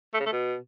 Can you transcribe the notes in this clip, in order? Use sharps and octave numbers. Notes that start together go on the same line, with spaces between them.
A3
C#3
A3
B2